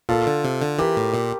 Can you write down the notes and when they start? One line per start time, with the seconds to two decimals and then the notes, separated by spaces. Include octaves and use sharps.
0.09 A#2 F4 A4
0.27 D3
0.44 C3
0.61 D3
0.78 E3 G4 A#4
0.97 A2
1.14 A#2